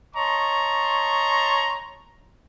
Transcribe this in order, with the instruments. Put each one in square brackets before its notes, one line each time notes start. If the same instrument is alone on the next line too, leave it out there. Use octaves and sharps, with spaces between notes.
[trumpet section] C#5 D#5 A5 A#5 C6 C#6